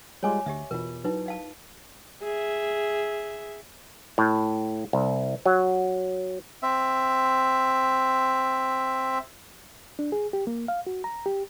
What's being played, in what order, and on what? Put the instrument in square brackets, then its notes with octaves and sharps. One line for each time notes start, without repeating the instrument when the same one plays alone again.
[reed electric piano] G3 G#3 F4 [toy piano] C#5 G#5 D6
[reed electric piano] D2 [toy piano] G4 D#5 E5
[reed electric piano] E2 B2 [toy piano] F4 A#4
[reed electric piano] F#3 [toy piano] D#4 E4 B4
[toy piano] D#5 F5 A5
[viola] G#4 E5
[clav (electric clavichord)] A2
C2
F#3
[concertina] C4 E5
[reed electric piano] D4
G#4
G4
A#3
F5
F#4
A#5
G4